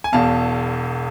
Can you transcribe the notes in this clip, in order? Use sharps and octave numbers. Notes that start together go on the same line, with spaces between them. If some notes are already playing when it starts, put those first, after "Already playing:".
G#5
E1 E2 B2 F5 A5